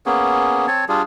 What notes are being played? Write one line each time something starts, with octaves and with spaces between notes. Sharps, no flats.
A#3 B3 C#4 G#4
C4 C#5 A5
G3 D4 F4 G#4